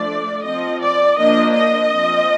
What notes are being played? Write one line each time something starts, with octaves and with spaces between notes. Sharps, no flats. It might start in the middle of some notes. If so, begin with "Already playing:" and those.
Already playing: F3 A3 D4 D5
F3 C4 D#5
D5
F3 A#3 D4 D#5
D#5
F3 C4